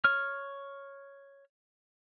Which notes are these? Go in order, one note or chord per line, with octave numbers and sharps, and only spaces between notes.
C#5 F6